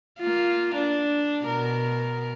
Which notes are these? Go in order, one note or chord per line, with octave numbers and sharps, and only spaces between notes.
A#3 F4
D4
B2 A#4